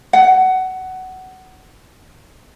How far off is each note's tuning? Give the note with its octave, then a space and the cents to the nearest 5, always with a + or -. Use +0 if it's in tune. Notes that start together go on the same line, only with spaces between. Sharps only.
F#5 +15